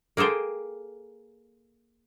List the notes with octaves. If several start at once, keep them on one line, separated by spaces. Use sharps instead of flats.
A#3 G#4 A4 C5 G5